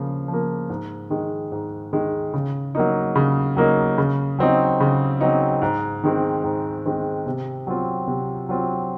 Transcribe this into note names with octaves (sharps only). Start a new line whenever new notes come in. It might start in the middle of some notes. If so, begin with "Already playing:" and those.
Already playing: C#3 F3 A#3
F3
A#3
G#2
D#3 G#3
G#2
D#3 G#3
C#3
F#3 A#3 D#4
C#3
F#3 A#3 D#4
C#3
F#3 C4 D#4
C#3
F#3 C4 D#4
G#2
D#3 G#3 C4
G#2
D#3 G#3 C4
C3
F#3 C4 F4
C3
F#3 C4 F4